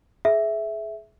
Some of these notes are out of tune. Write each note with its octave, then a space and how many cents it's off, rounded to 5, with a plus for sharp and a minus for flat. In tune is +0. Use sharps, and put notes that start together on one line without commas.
G#4 +25 E5 +0